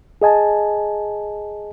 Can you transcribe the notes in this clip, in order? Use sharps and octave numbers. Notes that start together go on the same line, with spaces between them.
G#4 D#5 G#5 A5